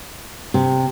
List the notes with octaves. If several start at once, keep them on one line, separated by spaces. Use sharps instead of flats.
C3